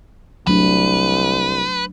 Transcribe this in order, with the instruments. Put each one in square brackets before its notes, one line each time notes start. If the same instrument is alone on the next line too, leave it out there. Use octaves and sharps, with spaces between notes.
[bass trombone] C2 [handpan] F#3 A3 D4 [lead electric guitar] B4